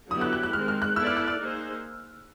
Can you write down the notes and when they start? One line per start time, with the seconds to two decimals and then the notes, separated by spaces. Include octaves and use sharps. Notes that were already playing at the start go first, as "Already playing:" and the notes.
0.11 D3 F#3 B3 E4 G4 D#6
0.21 F#6
0.33 F#6
0.43 F#6
0.53 D#3 G#3 C4 F6
0.68 F6
0.82 F#6
0.96 B3 E4 A4 D5 E6
1.07 F6
1.17 F#6
1.28 F6
1.38 A#3 D#4 G#4 C5